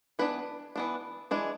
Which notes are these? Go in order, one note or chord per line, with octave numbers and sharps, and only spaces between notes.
E3 B3 D4 B4
E3 B3 D4
E3 G#3 D4